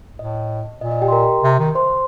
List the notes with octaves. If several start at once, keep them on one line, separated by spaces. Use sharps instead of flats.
A2 D#5
A#2 D#5
D#5
G4 G5
C6
A#4 A#5
C3
D#3
C5 C6